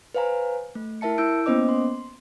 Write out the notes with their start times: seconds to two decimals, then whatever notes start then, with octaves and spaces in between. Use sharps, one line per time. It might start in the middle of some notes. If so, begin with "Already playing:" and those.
0.14 B4 C5 F5 G#5 A#5
0.75 A3
1.01 E4 A#4 E5 A5 C#7
1.18 E4 E6 G6 D7
1.46 A#3 B3 C#4 C5 D#5 D6
1.69 C6